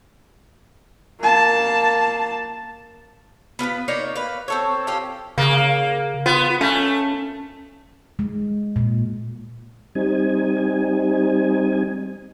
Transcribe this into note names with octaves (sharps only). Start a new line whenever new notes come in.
A#3 A5
B3 F4 A4 B4
A#3 D#4 C#5 D5
B4 F5
C4 A4 C#5
C#4 F4 G4 A4
C#3 A#3
B3 F4
A3 C#4
G#3
A#2
G3 C4 D#4 G#5